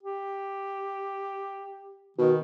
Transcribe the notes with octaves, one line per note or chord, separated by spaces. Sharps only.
G4
B2 D#3